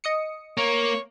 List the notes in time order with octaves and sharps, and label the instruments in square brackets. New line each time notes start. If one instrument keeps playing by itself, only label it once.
[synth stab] D#5 D#6 C#7
[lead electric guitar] A#3 [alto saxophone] C#5